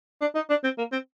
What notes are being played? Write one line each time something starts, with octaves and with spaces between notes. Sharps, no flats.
D4
D#4
D4
C4
A#3
C4